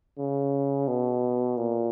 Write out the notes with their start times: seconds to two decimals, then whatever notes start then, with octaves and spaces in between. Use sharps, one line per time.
0.18 C#3
0.88 B2
1.57 A#2